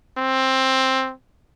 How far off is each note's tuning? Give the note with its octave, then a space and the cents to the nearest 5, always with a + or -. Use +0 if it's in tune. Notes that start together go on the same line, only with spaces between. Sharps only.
C4 +10